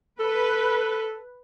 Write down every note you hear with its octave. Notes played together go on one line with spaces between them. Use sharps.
A4 B4